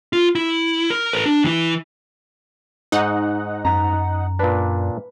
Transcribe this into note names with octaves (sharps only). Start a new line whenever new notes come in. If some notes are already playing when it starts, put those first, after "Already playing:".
F4
E4
A#4
A4 B4
D4
E3 E4
G#2 D#4 F#5
F#2 A#5
A#2 D4 B4